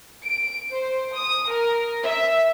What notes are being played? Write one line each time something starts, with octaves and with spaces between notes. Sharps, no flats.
D7
C5
D#6
A#4
E5